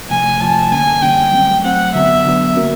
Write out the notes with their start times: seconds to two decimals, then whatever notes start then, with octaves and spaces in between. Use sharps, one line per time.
0.10 C3 F3 A3 G#5
0.40 C3 F3 A3 A5
0.71 D3 G3 A#3 C#4 G#5
1.02 D3 G3 A#3 C#4 G5
1.32 F#3 A3 C4
1.64 F#3 A3 C4 F#5
1.94 D3 F#3 B3 E5
2.25 D3 F#3 B3
2.56 A#3 C#4 F#4 A#4